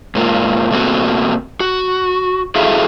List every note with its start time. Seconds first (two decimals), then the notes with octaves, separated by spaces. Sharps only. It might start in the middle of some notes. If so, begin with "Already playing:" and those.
0.15 G#2 A#3 F4
0.71 B2 A3 A#3 C4 F#4
1.60 F#4
2.55 E4 F#4 G#4 A4 E5 F5